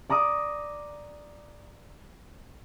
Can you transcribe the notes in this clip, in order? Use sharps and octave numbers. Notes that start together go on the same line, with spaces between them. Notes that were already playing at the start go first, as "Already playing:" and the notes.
D5 A#5 D6 D#6